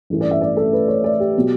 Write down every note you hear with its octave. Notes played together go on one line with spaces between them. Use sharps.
A1 G2 E3 A3 C#4
D5
E5
D5
A4
B4
C#5
D5
G4
B2 F#3